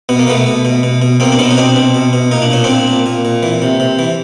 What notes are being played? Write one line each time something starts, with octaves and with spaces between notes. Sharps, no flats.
B2 B3
A#3
B2 A3 B3
B2
B2
B2
B2
B2 A#3 C4
D4
B2 B3 C#4
D#4
B2 C4 D4
B2
B2
B2
A#2 D#4
D4
A#2 C#4
A#2 C4 D4
A#2
A#2
A#2
E3
C3
C3
E3